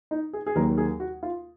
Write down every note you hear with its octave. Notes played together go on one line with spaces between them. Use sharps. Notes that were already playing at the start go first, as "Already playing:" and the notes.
D#4
G#4
G#4
D#2 D#3 F#3 A#3 A#4
G#4
F#4
F4